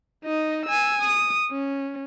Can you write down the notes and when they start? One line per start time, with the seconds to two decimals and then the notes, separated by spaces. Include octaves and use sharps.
0.25 D#4 D#5
0.66 G#5 E6
1.03 D#6
1.51 C#4